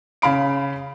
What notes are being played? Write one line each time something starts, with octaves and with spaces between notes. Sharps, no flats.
C#3 F5 B5 D7